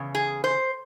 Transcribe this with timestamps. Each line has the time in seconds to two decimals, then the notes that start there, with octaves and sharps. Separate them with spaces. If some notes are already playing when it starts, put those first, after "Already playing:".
Already playing: E2 C#3
0.15 G#4
0.44 C5